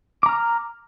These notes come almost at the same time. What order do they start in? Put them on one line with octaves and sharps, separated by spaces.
D6 A#5 F6